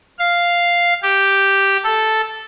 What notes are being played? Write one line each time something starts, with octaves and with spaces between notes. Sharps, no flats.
F5
G4
A4